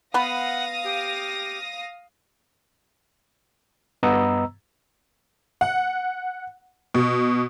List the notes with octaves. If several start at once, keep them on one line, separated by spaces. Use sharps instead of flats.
B3 B4 F5 F#5 D#6 A#6
G4
G2 B3 D#5 A#5 E6
F#5
B2